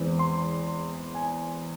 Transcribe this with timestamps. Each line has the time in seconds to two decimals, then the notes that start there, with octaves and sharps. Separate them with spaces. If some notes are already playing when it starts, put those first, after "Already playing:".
Already playing: E2 E3 G#3 C4
0.19 C6
1.15 G#5